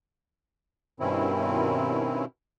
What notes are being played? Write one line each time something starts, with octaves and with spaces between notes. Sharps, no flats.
G2 B2 D#3 C4 C#4 E4